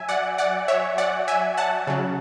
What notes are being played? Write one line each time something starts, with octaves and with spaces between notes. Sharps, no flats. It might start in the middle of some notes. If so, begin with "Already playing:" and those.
Already playing: F#3 E5 G#5
D5 F#5
D5 F#5
C#5 E5
D5 F#5
E5 G#5
F#5 A5
C#3 F#3